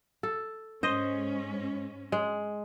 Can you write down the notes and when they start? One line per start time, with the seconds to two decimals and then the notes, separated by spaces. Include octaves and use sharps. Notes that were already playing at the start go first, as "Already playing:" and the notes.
0.23 A4
0.83 G#2 G#3 C#4 C5 D#5
2.12 G#3